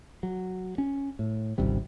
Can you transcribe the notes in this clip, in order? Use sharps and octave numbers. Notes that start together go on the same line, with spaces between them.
F#3
C#4
A2
G#1 C#2 C3 G3